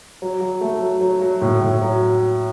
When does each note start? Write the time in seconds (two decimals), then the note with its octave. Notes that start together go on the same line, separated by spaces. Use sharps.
0.22 F#3
0.41 F#3
0.61 A3
0.82 F#3
1.01 F#3
1.21 F#3
1.41 A2
1.61 A2
1.82 F#3